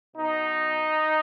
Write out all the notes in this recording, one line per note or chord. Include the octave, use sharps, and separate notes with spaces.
B2 D#4